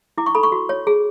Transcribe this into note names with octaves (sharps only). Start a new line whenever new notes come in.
E4 D6
C#6
A4 B5
C#6
F#4
C#5
G#4